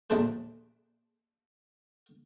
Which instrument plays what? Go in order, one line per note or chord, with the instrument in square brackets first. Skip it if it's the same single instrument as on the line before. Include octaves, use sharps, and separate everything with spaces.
[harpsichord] A#1 D#2 A3 D4 B4 C5